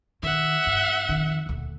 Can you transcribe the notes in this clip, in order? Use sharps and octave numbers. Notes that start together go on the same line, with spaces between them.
D#3 E5 F#5
G2
F2 D#3
D#1 D2